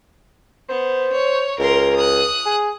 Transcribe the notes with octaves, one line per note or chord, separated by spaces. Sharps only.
B3 C5
C#5
C#2 A#4 C6
D#6 F#6
G#4